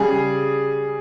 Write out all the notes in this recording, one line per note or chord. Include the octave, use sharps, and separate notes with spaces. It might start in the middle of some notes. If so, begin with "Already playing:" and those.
Already playing: C#3 G3 G#4